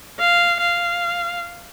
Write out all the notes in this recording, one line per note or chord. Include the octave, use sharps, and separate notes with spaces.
F5
F5